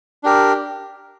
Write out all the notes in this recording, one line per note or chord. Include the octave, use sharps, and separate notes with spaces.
D4 G4 A#4